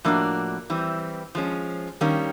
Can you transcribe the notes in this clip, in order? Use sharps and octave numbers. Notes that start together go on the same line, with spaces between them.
A2 F3 A#3 D4 F#4
E3 G3 C4
F3 G#3 C#4
D#3 G3 A#3 C#4